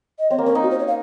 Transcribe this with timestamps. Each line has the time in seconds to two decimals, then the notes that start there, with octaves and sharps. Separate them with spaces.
0.19 D#5
0.30 C4 C#5
0.38 A#3
0.46 C#4 A#4
0.55 D#4
0.63 F#4
0.71 C5
0.79 C#5
0.87 F5